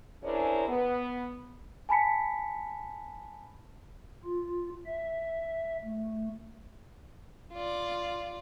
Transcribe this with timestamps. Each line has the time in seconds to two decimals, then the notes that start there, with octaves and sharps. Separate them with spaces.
0.24 C#4 D4 E4 G#4 A#4 C5
0.68 B3
1.89 G#5 A5 B5 B6 C#7
4.25 F4
4.86 E5
5.84 A3
7.53 F4 D5